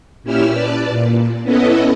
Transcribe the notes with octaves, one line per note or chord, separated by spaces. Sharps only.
A#2 C#4 E4 G4 E6 F6
B4 D5 A5
A#2
B3 C#4 E4 A4 B4 D#5